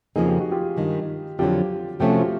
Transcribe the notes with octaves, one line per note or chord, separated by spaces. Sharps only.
F2 C#3 F3 A#3 D#4 G#4
G4
F#4
F4 G4
G2 D#3 G#3
F2 D3 F#3 F4 G4
C3 F3 A3 C#4 G4
F#4
F4